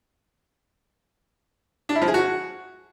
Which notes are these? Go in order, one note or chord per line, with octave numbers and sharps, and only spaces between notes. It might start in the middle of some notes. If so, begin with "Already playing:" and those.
D4
E4
F3
G#4
F#4